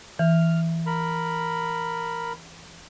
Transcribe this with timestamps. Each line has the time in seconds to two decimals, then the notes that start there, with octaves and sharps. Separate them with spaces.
0.19 E3 F6
0.86 A#4 B5